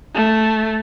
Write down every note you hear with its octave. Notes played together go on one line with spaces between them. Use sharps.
A3